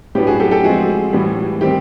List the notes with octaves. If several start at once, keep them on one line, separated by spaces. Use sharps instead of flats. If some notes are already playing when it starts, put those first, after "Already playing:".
A2 F#3 B3 D4 G4
F#4 G#4
G4 A4
G4 A4
F3 G#3 C4 F#4 G#4
A2 E3 G3
D#3 G3 C4 G4